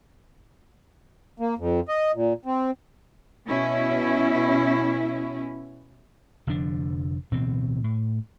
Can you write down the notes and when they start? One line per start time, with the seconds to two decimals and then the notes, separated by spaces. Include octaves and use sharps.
1.40 A#3
1.58 F2
1.88 D#5
2.14 A#2
2.45 C4
3.47 B2 C#4 E4
6.47 F1 D3 F3 D4
7.31 D1 B2 E3 C4
7.84 A2